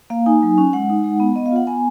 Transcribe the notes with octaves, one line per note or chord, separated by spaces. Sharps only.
A#3 F5
D#4 G#5
F#3
C#4
G#3 F#5
D#4
G#3
B3
B3 D#5
F5
F4 F#5
B3 G#5